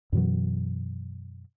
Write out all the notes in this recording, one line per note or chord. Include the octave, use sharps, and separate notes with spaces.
F#2 B2 E3 F#3